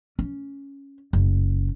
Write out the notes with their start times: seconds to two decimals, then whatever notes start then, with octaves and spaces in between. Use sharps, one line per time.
0.19 C#4
1.13 F#1